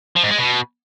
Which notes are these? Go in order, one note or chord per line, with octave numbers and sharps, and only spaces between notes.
F3
G#2
G#3
B2